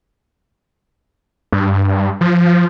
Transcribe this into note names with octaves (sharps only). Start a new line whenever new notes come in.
G2
F3